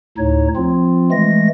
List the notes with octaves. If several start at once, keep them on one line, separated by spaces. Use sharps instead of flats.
D2 A2 D#4 C#5
F3 C4 F4
E3 G#3 A3 A#6